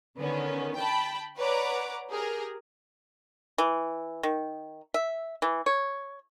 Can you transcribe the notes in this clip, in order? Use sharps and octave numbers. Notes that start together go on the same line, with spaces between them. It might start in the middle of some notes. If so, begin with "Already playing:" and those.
D3 D#3 B3 C#4
G5 A5 B5
B4 C#5 D5 F#5 A#5 D6
G4 G#4 A#4
E3
D#3
E5
E3
C#5